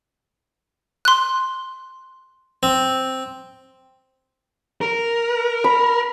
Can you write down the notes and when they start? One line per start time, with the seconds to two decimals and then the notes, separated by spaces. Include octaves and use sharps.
1.05 C6 F#6
2.63 C4
4.81 A#4
5.64 B5